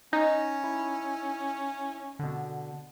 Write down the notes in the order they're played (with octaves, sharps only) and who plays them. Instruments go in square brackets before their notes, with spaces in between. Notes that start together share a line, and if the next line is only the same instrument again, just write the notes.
[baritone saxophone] C#4 [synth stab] D#4
[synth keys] E4
B2 D3